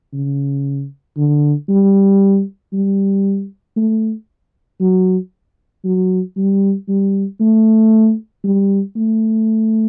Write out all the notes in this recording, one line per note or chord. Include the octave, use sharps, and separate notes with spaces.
C#3
D3
G3
G3
A3
F#3
F#3
G3
G3
A3
G3
A3